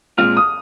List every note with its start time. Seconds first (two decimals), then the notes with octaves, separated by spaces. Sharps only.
0.18 A#2 G#3 C4 F4 F6
0.37 D#6